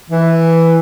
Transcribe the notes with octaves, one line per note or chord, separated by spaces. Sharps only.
E3